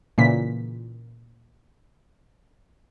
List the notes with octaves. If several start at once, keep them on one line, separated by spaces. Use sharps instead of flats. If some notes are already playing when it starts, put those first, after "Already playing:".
A#2 C#3 E3 B6